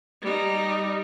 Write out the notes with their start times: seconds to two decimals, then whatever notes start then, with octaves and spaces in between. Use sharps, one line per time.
0.22 G3 D#4